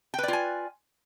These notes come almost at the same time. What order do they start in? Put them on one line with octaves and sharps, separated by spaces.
G5 B4 D5 F4 G#5